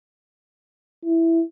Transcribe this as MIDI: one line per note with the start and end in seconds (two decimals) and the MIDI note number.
1.05 1.42 64